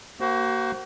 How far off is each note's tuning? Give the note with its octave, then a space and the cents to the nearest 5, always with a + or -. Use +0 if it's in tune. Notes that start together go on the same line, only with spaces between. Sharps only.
A#3 +0 F#4 +35 C5 +0